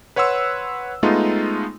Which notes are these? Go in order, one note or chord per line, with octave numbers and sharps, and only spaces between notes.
B4 C#5 F#5 C6 E6
G#3 A3 B3 D#4 F4